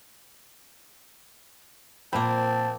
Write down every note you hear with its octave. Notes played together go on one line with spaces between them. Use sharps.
A#2 F3 A#3 C4 A5 B5